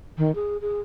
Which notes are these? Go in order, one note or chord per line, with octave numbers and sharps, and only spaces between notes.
D#3
G#4
G#4